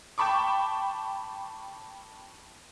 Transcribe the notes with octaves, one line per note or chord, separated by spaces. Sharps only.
G5 A5 B5 C#6 D6